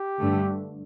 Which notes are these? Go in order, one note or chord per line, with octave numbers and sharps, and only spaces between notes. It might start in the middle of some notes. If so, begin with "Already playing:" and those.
Already playing: G4
G2 D3 A3